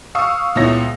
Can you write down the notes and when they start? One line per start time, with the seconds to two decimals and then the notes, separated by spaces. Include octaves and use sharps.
0.15 F5 C#6 D#6 E6
0.56 C#2 A#2 B3 E4 C#5 A#6